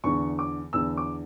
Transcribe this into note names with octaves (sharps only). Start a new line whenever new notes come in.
E2 D3 C#6
D6
E2 D3 E6
D6